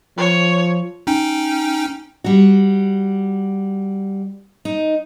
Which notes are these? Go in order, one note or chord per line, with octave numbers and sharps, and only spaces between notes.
F3 C#5
C#4 D#4 G5
G3 F#4
D#4